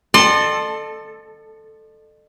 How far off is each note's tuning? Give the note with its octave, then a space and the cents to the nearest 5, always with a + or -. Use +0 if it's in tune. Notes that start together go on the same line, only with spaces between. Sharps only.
A4 +0 D#5 -45 C6 +15